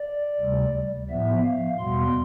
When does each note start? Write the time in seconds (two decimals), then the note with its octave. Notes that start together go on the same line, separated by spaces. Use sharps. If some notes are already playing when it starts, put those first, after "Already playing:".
Already playing: D5
0.40 D2 C3 G3
1.09 A2 F3 B3 E5
1.44 F5
1.79 E2 B2 G3 B3 C6